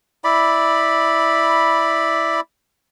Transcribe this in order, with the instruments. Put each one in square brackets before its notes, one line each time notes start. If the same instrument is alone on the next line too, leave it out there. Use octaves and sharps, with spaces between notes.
[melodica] E4 D5 B5